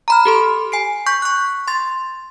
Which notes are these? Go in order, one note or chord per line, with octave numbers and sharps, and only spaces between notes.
A#5 B5 F6
G4 A4 C6
G#5 C7 D7
C#6 G6 B6
C#6 F#6
C6 A6